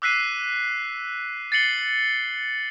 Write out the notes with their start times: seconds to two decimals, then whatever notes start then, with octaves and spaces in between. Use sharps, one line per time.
0.02 D6 E6 F#6 B6 C7 D#7
1.52 A6 C7 C#7 F#7 G7